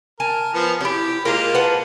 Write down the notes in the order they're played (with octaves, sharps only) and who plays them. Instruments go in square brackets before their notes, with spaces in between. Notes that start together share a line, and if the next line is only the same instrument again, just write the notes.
[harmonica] A#4 [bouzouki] G#5 A5
[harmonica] F3 B3
[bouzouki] C#4 E4 [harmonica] G4
[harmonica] G#3 A#3 F4 [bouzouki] A#4 A#5
[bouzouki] B4 F#5 A5